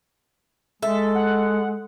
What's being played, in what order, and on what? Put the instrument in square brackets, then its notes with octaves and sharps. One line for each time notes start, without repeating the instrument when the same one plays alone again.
[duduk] G#3 [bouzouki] A4 [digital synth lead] E5
[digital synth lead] F#5